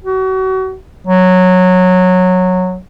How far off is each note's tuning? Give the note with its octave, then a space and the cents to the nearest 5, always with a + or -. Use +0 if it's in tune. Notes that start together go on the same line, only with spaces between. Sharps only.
F#4 +35
F#3 -10